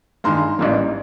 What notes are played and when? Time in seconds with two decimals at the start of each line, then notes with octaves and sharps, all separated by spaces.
0.24 G2 D#3 G#3 A#5 C6
0.58 A1 G#2 E3 G3 A#3